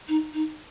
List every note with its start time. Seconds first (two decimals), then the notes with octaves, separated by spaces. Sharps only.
0.08 D#4
0.34 D#4